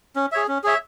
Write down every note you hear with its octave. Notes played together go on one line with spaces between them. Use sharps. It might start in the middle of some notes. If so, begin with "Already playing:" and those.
C#4
G#4 C#5 E5
C#4
G#4 C#5 E5